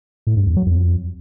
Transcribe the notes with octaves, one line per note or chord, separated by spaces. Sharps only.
A2
G2
E2
F#3
F2